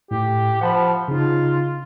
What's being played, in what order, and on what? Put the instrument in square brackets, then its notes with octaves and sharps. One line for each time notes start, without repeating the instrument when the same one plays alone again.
[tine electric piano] A2 [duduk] G4
[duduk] F3 [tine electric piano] F#5 A5 B5
[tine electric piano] C#3 D#4 [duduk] F4